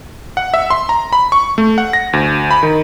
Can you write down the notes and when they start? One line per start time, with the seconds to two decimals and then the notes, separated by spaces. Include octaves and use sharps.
0.37 F#5
0.54 E5
0.70 C6
0.89 A#5
1.13 B5
1.32 C#6
1.58 A3
1.78 F#5
1.93 A#6
2.13 D2
2.51 B5
2.63 D#3